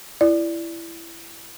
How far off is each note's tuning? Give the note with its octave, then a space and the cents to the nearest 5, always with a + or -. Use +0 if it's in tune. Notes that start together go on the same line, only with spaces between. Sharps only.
E4 +20 D5 +0